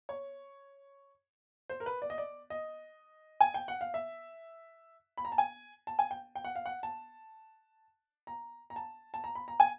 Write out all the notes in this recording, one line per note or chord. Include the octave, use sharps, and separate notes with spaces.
C#5
C5
A#4
B4
D5
D#5
D5
D#5
G#5
G5
F#5
F5
E5
B5
A#5
A5
G#5
A5
G#5
G5
G5
F#5
F5
F#5
A5
A#5
A#5
A5
A5
A#5
B5
A#5
G#5